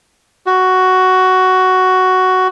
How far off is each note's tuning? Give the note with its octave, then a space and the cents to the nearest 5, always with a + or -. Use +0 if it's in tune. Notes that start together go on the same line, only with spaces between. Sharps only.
F#4 +10